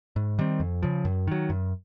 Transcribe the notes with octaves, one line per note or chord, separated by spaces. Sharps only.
G#2
D#3 G3 C4
F2
C#3 F3
F#2
D#3 F#3
F#2